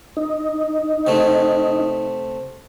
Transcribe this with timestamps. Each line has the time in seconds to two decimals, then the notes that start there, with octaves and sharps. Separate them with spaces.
0.17 D#4
1.07 C3 A3